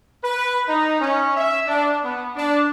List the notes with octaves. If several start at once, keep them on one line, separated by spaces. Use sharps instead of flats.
B4
D#4
C#4
E5
D4
B3
D4